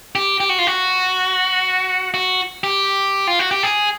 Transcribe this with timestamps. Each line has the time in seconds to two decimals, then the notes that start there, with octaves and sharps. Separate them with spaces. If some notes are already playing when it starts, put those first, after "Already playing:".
0.15 G4
0.40 G4
0.49 F#4
0.59 F4
0.67 F#4
2.14 F#4
2.64 G4
3.27 F4
3.39 F#4
3.51 G4
3.63 G#4